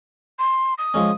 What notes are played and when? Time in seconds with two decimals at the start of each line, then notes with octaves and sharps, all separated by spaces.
0.39 C6
0.78 D#6
0.94 F3 G#3 C#4